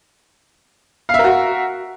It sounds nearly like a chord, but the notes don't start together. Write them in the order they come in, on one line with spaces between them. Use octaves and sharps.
F5 E5 A#4 F#4